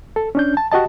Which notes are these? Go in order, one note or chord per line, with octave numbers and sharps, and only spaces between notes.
A4
C#4 D4 G6
A5
F#4 G4 D#5 A5